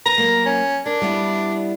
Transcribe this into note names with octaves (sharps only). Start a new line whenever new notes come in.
B4 A#5
F#3 A#3
C#4
D4 A#4
G3 B3 E4